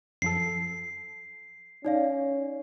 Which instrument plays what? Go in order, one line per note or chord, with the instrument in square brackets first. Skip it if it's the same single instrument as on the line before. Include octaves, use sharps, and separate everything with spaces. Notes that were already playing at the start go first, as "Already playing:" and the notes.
[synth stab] F#2 F3 A4 [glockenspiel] C7
[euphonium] C#4 [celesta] D#4 D5 F5